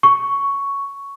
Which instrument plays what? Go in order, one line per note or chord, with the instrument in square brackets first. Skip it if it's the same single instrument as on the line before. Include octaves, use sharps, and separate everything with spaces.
[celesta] C#6